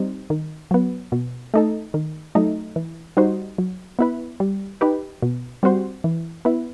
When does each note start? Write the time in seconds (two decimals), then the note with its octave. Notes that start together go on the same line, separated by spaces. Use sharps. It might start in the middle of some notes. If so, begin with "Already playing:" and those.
Already playing: G3 C4 D#4
0.30 D#3
0.71 F#3 B3
1.12 B2
1.54 A3 D#4 A4
1.94 D#3
2.35 F#3 A3 D#4
2.76 E3
3.17 G3 D#4 F#4 C5
3.58 F#3
3.99 B3 E4 B4
4.40 G3
4.81 D#4 G4 B4
5.22 B2
5.63 G3 C4 F#4 C5
6.04 E3
6.45 B3 E4